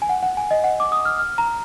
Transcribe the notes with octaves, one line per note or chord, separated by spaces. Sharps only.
G#5
F#5
F#5
G#5
D#5
F#5
D6
D#6
F6
F6
A#5